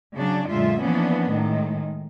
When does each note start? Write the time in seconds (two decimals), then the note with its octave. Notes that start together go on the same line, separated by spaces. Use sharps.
0.16 C#3 F#3 D4
0.50 F#2 A#2 D3 G#3 F4 E5
0.82 E3 F3 A#3 B3 C#4 D4
1.30 A2 D#3 G#3